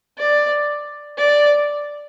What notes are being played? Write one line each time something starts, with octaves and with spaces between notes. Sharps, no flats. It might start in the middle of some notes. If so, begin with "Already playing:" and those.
D5
D5